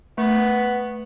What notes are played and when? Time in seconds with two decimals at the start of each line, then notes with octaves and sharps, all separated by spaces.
0.18 A3 B3